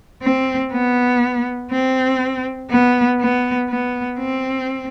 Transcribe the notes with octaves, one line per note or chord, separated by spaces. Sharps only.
C4
B3
C4
B3
B3
B3
C4